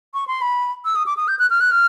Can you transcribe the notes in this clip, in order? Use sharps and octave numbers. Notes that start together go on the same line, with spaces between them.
C#6
C6
B5
E6
D#6
D6
D#6
G6
F#6
F6
F#6
F6